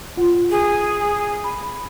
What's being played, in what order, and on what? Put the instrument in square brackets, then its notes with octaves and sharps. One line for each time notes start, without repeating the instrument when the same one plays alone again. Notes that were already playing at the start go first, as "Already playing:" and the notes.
[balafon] F4 F#5
[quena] G#4
[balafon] B5